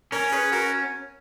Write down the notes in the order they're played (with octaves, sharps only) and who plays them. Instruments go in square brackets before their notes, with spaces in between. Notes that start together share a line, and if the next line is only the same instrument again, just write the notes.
[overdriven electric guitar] C#4 [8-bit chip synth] A#4 C#5
[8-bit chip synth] C#5
G#4 B4
F#4 A#4